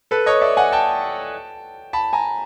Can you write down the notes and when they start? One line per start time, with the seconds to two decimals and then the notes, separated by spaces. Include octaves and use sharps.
0.11 A4 B4
0.26 C#5 D#5
0.41 D5 E5
0.57 F#5 G#5
0.72 G5 A5
1.93 A5 B5
2.13 G#5 A#5